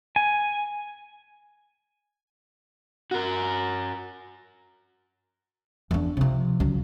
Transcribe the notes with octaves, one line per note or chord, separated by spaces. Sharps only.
G#5
F#4 A#4
E2 D4
C3 F3
C#2 F#3